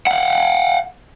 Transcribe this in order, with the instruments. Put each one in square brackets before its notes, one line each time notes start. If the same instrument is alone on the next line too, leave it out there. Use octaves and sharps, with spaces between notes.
[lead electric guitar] F5 F#5